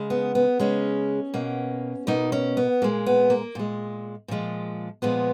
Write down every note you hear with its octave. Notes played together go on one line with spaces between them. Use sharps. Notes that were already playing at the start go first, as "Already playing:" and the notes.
Already playing: C#3 G#3
B3
B3
C#3 G#3 C#4
B2 A#3
B2 A#3 D#4
C#4
B3
A#2 G#3 A#3
B3
A#3
A#2 G#3
A#2 F3 G#3
A#2 F3 G#3 B3